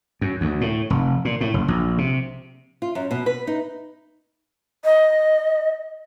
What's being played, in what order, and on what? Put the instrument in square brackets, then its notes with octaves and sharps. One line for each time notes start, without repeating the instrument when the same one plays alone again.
[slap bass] F#2
D2
A2
F1
A#2
A2
F#1
A#1
C3
[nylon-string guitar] F4
F#2
B2
B4
D#4
[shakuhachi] D#5